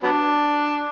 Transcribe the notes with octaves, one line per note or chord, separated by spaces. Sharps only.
F#3 B3 D4